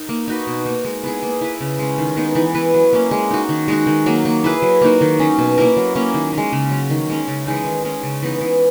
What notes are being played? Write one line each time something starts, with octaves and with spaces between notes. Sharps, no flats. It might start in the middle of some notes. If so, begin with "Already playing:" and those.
Already playing: D#4 A#4
A#3
D#4 F#4 B4
B2
A#3 D#4
G#3
B3 E4 G#4
A#3
E4 B4
C#3
G#3 C#4
D#3
G#3 B3 D#4
E3
B3 E4 B4
F#3
A#3 C#4
G#3
D#4 F#4
D#3
G#3 D#4 F#4
D#3
F#3 A#3
A#3
E4 G#4 B4
F#3
A#3 D#4 F#4
D#3
F#3 C#4
B2
A#3 E4 A#4
F#3
A#3 C#4
D#3
G#3 C#4
C#3
F#3 C#4
D#3
G#3 C#4
C#3
E3 G#3 D#4
D#3
G#3 C#4
C#3
E3 B3 D#4
E3